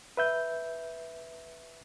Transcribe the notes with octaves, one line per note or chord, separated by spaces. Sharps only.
B4 E5 G6